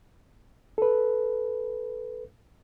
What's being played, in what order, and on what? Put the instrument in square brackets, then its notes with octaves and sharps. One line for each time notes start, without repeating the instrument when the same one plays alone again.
[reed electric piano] A4 B4